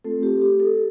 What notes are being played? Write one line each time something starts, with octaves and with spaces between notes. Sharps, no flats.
A3 C4 F4 A4
G4
G4
A4